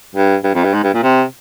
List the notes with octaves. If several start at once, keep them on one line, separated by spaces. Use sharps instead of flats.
G2
G2
F2
G2
G#2
G2
A#2
C3